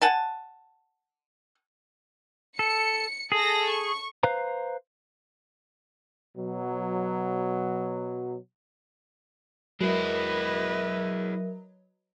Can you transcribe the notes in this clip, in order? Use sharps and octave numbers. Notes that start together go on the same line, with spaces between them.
F#5 G#5 A5
A4 C#7
G#4 A4 A#6
C#6
B4 C5 F5 A#5
B2 F#3
F#3 G#3 E4 A#4 B4 D#5 E5